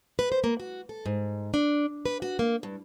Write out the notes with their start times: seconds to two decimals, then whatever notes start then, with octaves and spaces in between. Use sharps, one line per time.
0.19 B4
0.32 C5
0.44 A#3
0.60 F#4
0.89 A4
1.06 G#2
1.54 D4
2.06 B4
2.22 F#4
2.39 A#3
2.63 G2